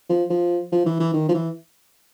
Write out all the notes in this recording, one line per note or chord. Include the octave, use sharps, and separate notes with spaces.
F3
F3
F3
E3
E3
D#3
F3
E3